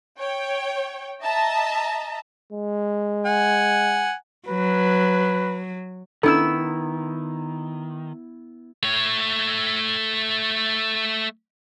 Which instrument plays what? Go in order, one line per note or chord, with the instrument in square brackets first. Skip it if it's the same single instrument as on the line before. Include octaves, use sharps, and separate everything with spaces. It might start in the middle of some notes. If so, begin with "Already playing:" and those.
[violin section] C#5 G5
D#5 E5 A5 A#5
[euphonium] G#3
[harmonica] F#5 G#5
[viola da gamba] F#3 [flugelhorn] B4
[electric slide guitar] D#3 [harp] B3 E4 E6 [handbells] C#4 D4 A4
[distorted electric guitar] A3 C#5